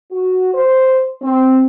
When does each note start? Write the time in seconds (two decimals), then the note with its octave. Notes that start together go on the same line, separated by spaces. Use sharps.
0.10 F#4
0.54 C5
1.21 C4